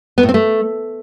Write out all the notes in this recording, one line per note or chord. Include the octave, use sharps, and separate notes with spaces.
B3
A2
C4
A3